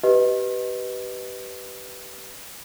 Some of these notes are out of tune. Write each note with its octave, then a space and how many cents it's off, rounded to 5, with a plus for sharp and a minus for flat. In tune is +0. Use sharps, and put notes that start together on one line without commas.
G4 -25 B4 +0 D#5 +0